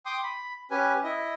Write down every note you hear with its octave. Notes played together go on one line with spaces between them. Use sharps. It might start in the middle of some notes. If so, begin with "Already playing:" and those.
G5 C6 D6 D#6
B5
C#4 G4 B4 G#5
E4 D#5